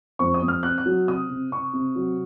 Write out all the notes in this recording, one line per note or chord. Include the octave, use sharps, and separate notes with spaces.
F2 C#6
D#6
F2
F6
C4 F#6
F#6
F#3
C3 D#6
C3
C3 C#6
C3
F#3